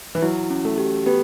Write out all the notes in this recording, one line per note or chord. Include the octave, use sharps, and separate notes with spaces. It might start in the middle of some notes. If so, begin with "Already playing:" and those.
E3
F#3 E4
C#4
A3
G4
B3 G4